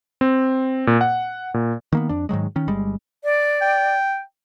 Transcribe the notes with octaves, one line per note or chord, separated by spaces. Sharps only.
C4
A#2
F#5
A#2
D#3 A#3 B3
F2 D4
G#2 D#3 F#3 G#3
D#3 C#4
G1 G3 G#3
D5
G5